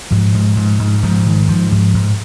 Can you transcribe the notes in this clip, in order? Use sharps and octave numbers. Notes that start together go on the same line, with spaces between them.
G#2 F3
G#2
G#2
G#2
G#2 F3
G#2 D#3
G#2 F3
G#2 F3
G#2